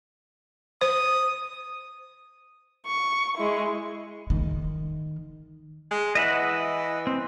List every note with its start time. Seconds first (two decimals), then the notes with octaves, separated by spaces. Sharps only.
0.81 C5 D#6
2.87 C#6
3.38 G#3 E4
4.30 D#3
5.91 G#3
6.15 E3 D#5 E5 F#5
7.07 C4